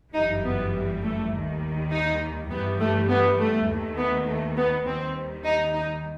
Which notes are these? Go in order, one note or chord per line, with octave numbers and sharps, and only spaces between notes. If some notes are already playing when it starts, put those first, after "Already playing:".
G1 F#2 E3 G3 D#4
B3
A3
D#2 D#3 G3
D#4
G2 E3 G3 B3
A3
B3
A3
D#2 D#3 A3
B3
A3
B3
D#2 D#3 G3 C4
D#4
D#4